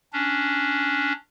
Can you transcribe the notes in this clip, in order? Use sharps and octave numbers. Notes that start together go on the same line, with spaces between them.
C#4 D4